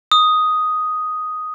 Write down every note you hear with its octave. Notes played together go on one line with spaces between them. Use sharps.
D#6